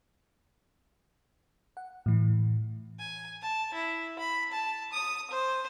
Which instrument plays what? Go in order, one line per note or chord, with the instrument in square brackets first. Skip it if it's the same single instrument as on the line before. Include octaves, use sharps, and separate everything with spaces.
[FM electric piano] F#5
A2 E3
[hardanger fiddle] G#5
A5
E4
B5
A5
D#6
C5